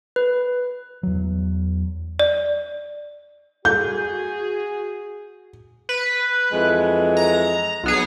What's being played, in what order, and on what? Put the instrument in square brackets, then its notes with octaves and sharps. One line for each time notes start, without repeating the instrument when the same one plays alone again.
[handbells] B4
[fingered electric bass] E2 F#3
[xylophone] D5
[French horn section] F#4 G#4 [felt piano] G6
[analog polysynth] B4
[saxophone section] F2 E3 G#3
[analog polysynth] A#5
B1 B3 G#4